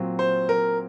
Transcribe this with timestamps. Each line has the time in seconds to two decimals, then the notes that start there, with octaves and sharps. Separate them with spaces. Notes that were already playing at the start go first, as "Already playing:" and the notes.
Already playing: A#2 F#3 C4
0.19 C5
0.49 A#4